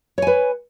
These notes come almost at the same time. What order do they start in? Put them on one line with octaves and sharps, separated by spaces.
C#5 G#5 B4